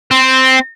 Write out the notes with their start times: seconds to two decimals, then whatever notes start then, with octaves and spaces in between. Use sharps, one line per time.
0.11 C4